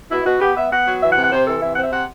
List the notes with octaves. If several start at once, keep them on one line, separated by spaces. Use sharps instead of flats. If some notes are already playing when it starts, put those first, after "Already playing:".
B2 E4
B2 F#4
B3 G4
B3 E5
B3 F#5
F#3
E3 E5
F#5
C3
F#5
C3 C5
E3 A4
C3 E5
F#5
C4
E5
C3 F#5